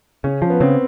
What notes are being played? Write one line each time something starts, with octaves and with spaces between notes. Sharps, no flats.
C#3 C#4
F3
B3
C#3 C4